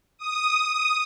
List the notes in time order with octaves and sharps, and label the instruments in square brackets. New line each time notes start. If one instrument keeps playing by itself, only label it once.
[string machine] D#6